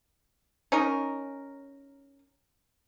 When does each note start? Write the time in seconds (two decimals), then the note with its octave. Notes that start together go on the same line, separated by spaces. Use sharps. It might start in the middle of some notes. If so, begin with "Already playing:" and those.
0.72 C#4 D#4 A#4